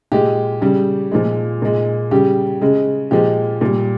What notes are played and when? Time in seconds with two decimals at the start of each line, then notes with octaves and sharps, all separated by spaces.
0.12 A#2 G#3 G4
0.61 C#3 G3
1.11 A#2 F3 G#3
1.62 A#2 G#3
2.11 C#3 G3 G4
2.61 C#3 G#3
3.11 A#2 F3 G#3 G4
3.61 A#2 G3